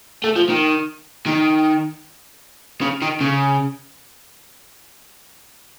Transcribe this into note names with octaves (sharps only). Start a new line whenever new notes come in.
A3
F3
D#3
D#3
C#3
D#3
C#3